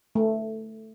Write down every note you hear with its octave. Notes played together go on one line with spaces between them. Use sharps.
A3